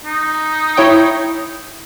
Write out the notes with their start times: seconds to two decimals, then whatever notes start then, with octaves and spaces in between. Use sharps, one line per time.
0.05 D#4
0.77 E4 C#5 G5